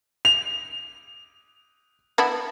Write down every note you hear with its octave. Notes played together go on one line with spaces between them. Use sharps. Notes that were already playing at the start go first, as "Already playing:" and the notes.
F7
B3 D4 E4